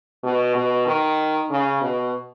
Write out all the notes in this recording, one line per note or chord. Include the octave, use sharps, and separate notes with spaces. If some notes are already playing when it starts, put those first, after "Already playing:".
B2
B2
D#3
C#3
B2